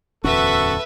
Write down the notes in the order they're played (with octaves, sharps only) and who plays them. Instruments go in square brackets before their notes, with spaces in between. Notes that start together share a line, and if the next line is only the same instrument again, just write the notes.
[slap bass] D1 E2 C#4 [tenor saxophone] F#4 [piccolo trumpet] A4 [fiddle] B4 E5